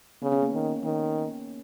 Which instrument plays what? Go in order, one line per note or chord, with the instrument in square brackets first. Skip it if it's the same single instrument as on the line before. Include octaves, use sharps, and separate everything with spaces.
[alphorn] C#3 [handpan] B3
[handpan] C#4
A#3
[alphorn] D#3
D#3